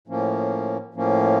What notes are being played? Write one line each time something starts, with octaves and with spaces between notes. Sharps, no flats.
A2 F3 A#3 C#4
A2 F3 A#3 C#4